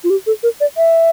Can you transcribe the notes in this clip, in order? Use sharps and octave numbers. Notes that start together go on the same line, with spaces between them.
F4
G4
A4
A#4
D5
E5